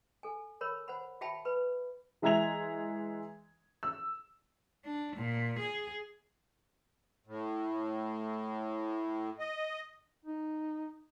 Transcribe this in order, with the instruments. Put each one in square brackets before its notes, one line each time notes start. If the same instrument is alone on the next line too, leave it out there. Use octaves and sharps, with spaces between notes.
[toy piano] A4 G#5
A#4 C#5 B5
C5 F#5 B5
F#4 E5 G5 A5 B5
B4 B5
[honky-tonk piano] E3 G#3 E5 A#5 G#6 F7
E6
[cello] D4
A#2
G#4
[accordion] A2
D#5
[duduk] D#4